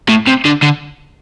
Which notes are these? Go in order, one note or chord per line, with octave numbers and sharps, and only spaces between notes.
A2
C3
D3
D3